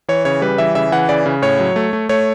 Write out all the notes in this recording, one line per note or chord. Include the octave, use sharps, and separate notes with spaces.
E3 C#5
C#3 C#5
G3 B4
E3 E5
C#3 E5
E3 F#5
C#3 D5
C#3
A2 C#5
F#3
A3
A3
A3 C#5